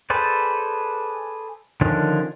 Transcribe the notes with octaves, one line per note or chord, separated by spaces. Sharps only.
G#4 A4 B4 C5 D5
D3 D#3 F3 C#4 D4